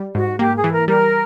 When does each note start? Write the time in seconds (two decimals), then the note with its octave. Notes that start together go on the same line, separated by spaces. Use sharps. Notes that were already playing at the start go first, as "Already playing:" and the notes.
Already playing: G3
0.15 G#2 F#4
0.39 A#3 G4
0.56 G#4
0.64 E3
0.71 A#4
0.88 G3 A#4